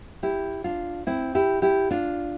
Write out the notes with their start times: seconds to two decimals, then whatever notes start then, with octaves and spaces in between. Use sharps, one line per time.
0.23 E4 G4
0.64 D4 F4
1.07 C4 E4
1.35 E4 G4
1.62 E4 G4
1.91 D4 F4